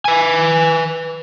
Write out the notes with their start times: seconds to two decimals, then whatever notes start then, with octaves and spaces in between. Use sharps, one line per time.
0.05 B4 G#5